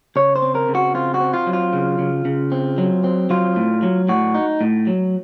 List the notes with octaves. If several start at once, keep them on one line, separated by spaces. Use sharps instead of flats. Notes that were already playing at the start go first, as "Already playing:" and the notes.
C#3 C#5
C5
C4
A#4
C#3
F#4
C4 F4
F#4
C4
F4
F#3
F4
C#3
C#3
C#3
C4
F#3
C4
F#3 F4
A2
F#3
A2 F#4
D#4
A2
F#3